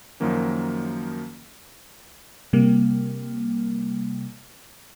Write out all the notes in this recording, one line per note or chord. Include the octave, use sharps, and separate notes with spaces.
F#2 D#3 F3 F#3 A#3 C#4
C3 G3 A#3